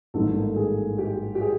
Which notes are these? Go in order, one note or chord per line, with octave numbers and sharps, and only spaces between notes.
A1 G#2 D#3 G3 A#3 A4
A4
G#4
G4
G4
G#4